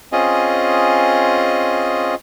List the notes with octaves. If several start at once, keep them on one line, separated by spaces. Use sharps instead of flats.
C4 C#4 F4 G#4 D#5